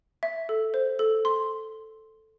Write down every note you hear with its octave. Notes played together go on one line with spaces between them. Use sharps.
E5
A4
C5
A4
C6